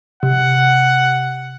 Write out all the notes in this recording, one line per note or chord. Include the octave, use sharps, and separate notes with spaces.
C3 F#5